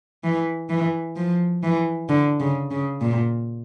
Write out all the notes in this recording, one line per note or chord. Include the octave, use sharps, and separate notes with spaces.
E3
E3
F3
E3
D3
C#3
C#3
A#2